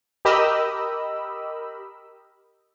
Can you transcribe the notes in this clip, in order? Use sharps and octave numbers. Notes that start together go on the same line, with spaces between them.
G4 A#4 D#5 B5 E6